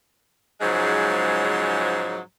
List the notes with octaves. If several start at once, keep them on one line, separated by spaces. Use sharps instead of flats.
G#2 C#3 F3 F#3 G#3